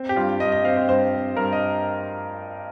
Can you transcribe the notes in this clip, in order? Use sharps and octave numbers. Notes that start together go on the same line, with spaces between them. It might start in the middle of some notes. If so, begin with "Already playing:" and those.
Already playing: C4
G4
G2 F4
G2 D#5
D#5
C4 F5
C5
G2 C5
C4
G2 A#4
D#5